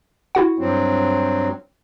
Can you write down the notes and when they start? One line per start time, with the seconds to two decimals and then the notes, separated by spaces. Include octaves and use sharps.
0.35 E4 F#4 F#5
0.59 G2 F#3 C4